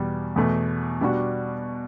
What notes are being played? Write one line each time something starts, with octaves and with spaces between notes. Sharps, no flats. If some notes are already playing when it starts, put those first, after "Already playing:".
Already playing: E2 B2 G3
E2 B2 A3
B2 G3 D4 F#4